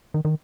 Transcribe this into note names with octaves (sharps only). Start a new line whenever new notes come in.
D#3
D#3